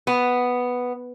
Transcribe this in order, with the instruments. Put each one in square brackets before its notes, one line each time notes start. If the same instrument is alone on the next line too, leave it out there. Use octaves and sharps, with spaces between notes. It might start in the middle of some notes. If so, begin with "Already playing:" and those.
[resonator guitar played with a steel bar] B3